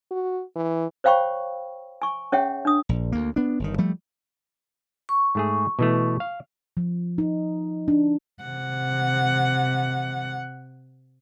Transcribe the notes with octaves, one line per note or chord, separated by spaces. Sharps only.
F#4
E3
C5 C#5 F5 G5 B5 C#6
G#5 C#6
C#4 G#4 C#5 E5 F#5 G5
D4 D#6
A#1
D2 A#3
B3 D4
G1 D#3
F3 G3 A3
C#6
G#2 A3 G#4
B2 E3 A3
F5
F3
D#4
D4
C3 F#5